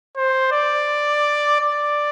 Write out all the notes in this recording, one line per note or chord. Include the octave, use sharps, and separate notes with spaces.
C5
D5
D5